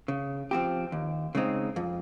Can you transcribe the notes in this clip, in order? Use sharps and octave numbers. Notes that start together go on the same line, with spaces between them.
C#3
F3 C4 G4
D#2
C#3 G#3 C4 D#4
F2